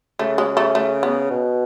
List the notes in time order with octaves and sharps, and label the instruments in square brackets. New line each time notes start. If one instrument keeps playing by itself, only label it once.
[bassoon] C#3 [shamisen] A3
[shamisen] G#3
A3
A3
B3
[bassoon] B2